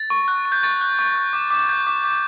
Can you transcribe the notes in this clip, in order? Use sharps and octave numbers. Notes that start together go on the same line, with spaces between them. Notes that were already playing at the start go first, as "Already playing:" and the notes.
Already playing: A6
C#6
F#6
C#6
G6
C#6 A6
F#6
C#6
G6
D6
D6
G6
D6
D6